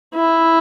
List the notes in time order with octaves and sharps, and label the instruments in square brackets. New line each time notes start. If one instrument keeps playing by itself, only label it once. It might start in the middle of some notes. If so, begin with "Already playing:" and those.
[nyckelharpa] E4